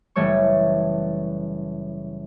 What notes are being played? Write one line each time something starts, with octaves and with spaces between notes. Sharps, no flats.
F#1 E3 G3 A3 C#5 C#6